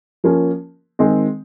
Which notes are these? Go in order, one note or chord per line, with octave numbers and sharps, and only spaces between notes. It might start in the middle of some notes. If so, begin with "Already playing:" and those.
F3 A#3 C#4
D#3 G#3 C4